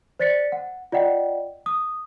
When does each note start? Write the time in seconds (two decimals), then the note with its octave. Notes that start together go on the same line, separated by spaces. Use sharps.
0.19 C5 D5 A6 B6 C#7
0.52 F#5
0.92 F4 D5 D#5 F#5 G5
1.66 D#6